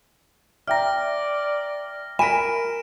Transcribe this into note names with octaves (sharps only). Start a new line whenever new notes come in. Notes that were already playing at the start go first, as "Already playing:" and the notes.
D5 E5 G5 A#5 F6 A#6
A#4 G#5 B5 B6 D7 E7